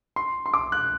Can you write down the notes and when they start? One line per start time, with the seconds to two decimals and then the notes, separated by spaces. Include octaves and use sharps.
0.16 C6
0.46 C6
0.54 D6
0.72 F#6